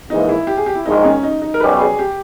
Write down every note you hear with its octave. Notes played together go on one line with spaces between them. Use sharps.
A#1 G#2 E3 A#3 D#4
E4
G4
G#4
G4
E4
A#1 G#2 D#3 G#3 D#4
C#4
D#4
D#4
A#4
B1 B2 G3 C#4 B4
G#4
G4